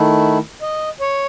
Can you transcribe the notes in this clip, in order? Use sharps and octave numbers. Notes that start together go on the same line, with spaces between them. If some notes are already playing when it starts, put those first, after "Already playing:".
Already playing: D#3 A3 E4
D#5
C#5